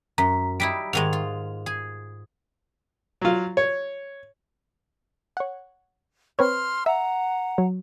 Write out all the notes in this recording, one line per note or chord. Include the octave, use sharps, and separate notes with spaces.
F#2 A#5 B6
G3 D#4 E4 B6 D7
G#2 D#3 G#3 F7
F4
G#4
F#3 F4
C#5
C#5 F#5
C4 B4 C#5 C6 F6
E5 F#5 A#5
F#3